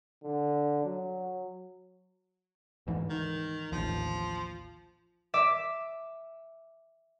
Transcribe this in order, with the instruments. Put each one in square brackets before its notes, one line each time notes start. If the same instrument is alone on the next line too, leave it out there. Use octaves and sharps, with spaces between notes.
[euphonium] D3
F#3
[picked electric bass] D2 G#2 E3
[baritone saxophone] D#3
[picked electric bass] A1 D#2 [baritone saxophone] F3
[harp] E5 D6